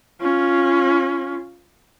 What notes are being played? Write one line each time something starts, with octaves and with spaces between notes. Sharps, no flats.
C#4 F4